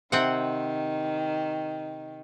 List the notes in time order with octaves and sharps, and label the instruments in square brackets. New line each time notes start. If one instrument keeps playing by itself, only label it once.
[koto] C3 C4 F#5 [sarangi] D#3